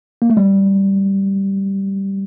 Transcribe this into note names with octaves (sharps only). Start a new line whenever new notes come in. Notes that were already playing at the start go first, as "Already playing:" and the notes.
A#3
A3
G3